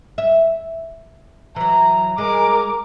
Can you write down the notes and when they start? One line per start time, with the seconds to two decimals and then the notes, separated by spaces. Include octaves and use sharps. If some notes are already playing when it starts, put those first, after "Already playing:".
0.18 E5
1.56 E3 F#3 A#5
2.18 G#3 A#4 D6